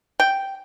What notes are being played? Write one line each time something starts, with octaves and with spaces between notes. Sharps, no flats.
G5